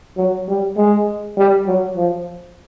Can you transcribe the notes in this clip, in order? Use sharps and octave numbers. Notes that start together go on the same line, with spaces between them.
F#3
G3
G#3
G3
F#3
F3